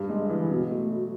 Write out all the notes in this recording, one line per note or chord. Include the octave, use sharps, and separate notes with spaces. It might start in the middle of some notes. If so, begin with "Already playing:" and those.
Already playing: G2
G#3
E3
B2
A3
F#3